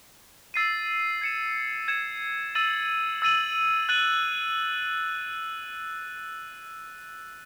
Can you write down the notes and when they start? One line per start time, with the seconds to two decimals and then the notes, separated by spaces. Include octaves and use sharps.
0.54 E6 A6 C7 D#7
1.22 G#6 C#7 E7
1.88 G#6 C#7 E7
2.55 E6 A6 D#7 F#7
3.22 E6 A6 D#7 F#7
3.89 F#6 A6 D#7 F#7